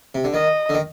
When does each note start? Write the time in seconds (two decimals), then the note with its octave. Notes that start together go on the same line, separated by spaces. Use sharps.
0.15 C3
0.24 D3
0.34 D#3 D#5
0.69 D3
0.74 D#3